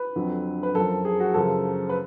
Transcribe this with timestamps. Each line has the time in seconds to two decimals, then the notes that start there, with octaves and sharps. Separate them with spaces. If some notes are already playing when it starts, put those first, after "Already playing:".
Already playing: B4
0.16 F2 D3 F#3
0.63 B4
0.75 F#2 F3 A4
1.05 G#4
1.20 F#4
1.34 F#2 C#3 F3 A4
1.89 B4